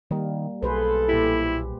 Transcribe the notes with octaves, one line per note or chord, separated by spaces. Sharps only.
D#3 G3 A#3
B1 G#4 A4 B4 C5
A#2 E4 G4